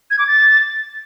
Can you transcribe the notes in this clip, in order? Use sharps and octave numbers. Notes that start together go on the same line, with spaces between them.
G#6
D6
A6